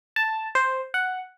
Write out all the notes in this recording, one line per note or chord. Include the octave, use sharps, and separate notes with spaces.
A5
C5
F#5